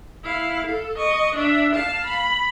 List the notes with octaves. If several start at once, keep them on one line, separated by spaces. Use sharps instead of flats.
E4 F5
A4
D#5 C#6
D4 E5
F5 A5
B5